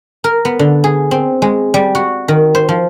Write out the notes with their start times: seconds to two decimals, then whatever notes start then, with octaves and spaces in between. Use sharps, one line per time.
0.24 A#4
0.45 B3
0.59 D3
0.84 G#4
1.11 C4
1.42 G#3
1.74 G3
1.95 F#4
2.28 D#3
2.55 C5
2.69 F3